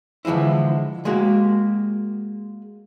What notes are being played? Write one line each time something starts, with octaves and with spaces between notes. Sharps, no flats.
D3 E3 F3 G#3 E4
G#3 A#3 F#4 G4